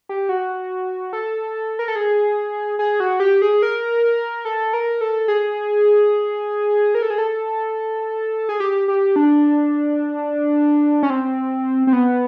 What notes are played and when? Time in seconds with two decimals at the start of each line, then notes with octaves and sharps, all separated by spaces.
0.09 G4
0.29 F#4
1.13 A4
1.79 A#4
1.88 A4
1.96 G#4
2.79 G#4
3.00 F#4
3.20 G4
3.42 G#4
3.62 A#4
4.45 A4
4.73 A#4
5.01 A4
5.28 G#4
6.95 A#4
7.02 A4
7.10 G#4
7.18 A4
8.49 G#4
8.60 G4
8.88 G4
9.16 D4
11.03 C#4
11.10 C4
11.87 C4
11.93 B3